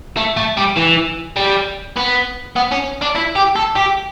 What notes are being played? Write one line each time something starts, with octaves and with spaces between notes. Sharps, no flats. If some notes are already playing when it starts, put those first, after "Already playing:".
A3
A3
G3
E3
G3
B3
B3
C#4
D4
E4
G4
A4
G4